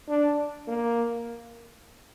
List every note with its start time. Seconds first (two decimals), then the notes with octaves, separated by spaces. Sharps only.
0.08 D4
0.67 A#3